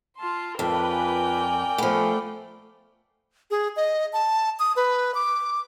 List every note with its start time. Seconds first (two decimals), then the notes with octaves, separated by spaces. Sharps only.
0.17 F4 A5 C6
0.59 F2 F4 A#4 B4 D5 G5
0.92 G#5
1.78 F3 A3 B3
3.51 G#4
3.76 D#5
4.13 A5
4.59 D#6
4.76 B4
5.15 D6